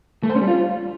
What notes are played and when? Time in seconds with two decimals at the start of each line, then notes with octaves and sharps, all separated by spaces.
0.23 A3
0.29 C5
0.35 C#4
0.42 G3
0.48 F4